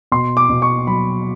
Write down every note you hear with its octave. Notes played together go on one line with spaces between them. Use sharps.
B2 C6
D6
B2
C#6
F#3 B5